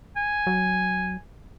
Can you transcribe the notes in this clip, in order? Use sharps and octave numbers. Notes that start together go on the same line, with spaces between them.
G#5
F#3